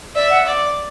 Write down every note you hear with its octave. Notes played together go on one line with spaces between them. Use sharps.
D5 E5
F#5
D5